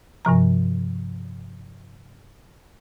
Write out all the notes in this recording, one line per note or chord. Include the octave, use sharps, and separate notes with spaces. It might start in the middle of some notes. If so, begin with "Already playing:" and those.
G2 C3 F3 A#5